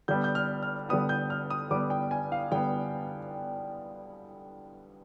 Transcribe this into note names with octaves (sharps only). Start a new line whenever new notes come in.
D3 G3 B3 G6
G6
F6
F6
D3 G3 B3 D#6
G6
F6
D#6
D3 G3 B3 D6
G5
G#5
F5
D3 G3 B3 G5